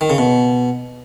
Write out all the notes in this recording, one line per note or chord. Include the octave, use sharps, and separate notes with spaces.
D#3
C#3
B2